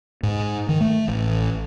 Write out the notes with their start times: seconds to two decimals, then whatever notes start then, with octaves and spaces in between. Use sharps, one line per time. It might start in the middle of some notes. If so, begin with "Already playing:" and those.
0.23 G#2
0.69 D#3
0.81 A3
1.08 A1